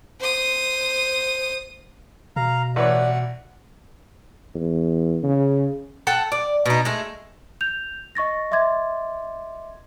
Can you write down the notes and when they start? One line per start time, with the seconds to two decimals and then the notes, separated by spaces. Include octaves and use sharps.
0.20 C5 D#6
2.36 B2 F5 A#5
2.76 A1 B4 C#5 D5 F#5
4.55 E2
5.23 C#3
6.07 A4 F#5 G5
6.32 D5
6.66 B2 D#4
6.85 G#3 A3
7.61 G6 F7
8.15 D#5 C#6 A6 A#6
8.51 D#5 E5 C6 D6 G#6 A6